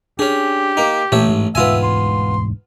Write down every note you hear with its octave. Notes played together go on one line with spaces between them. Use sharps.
C#4 D4 G4 G#4
A#3 D#4
A1 A#2 C#5 E5
G#2 G#3
E1 D2 G#2 B3 F4 E5 G#5
C6